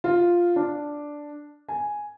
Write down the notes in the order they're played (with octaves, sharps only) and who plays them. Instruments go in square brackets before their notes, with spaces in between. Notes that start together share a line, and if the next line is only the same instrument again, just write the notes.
[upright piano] F4
D4
G#5